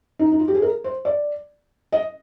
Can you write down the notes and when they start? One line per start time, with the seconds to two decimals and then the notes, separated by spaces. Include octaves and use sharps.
0.19 D#4
0.32 D#4
0.39 F4
0.48 G4
0.55 G#4
0.62 A#4
0.84 C5
1.05 D5
1.92 D#5